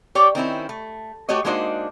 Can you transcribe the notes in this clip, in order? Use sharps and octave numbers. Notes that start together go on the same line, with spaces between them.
G4 C#5 D5
D#3 C4 C#4 E4
A3
A3 F#4 G4 C#5 D#5
G#3 A#3 D4 D#4 F#4 C5